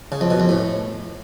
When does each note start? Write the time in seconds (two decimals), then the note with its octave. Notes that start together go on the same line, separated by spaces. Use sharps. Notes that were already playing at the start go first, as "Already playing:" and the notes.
0.12 C#3
0.21 F2
0.30 B2
0.40 F2
0.49 A2